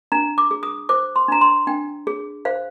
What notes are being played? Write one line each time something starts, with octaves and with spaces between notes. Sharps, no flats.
D4 A#5
D6
G#4
D#6
C5 D6
C6
D4 A#5
C6
D4 G5
G#4
C5 F5